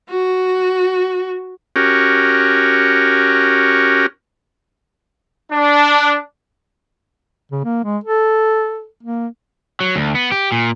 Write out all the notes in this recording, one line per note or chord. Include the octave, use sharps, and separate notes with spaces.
F#4
C#4 F#4 G4 A#4
D4
C#3
A#3
G#3
A4
A#3
F#3
D2
B3
G4
A#2